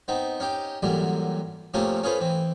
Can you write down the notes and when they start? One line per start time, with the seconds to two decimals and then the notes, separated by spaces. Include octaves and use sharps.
0.08 B3 C4 D#4
0.40 C#4 D#4 G4 G5
0.83 F#2 A#2 D3 E3 F#3 G3
1.74 C3 F3 A3 A#3 C4 C#4
2.03 C#4 F4 G#4 A4 B4 C5
2.20 E3 C4